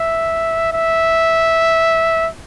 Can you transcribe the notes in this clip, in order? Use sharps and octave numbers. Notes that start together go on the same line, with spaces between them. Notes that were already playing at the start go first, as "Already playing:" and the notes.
Already playing: E5
E5